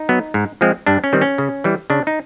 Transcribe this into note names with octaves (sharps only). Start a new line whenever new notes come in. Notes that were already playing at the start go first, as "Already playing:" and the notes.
Already playing: D#4
F#3 B3
G#2
F3 G#3 C4
G2 D4
C#4
D#3 G3 C4
C#4
C#3
E3 G3
C#3 D4
D#4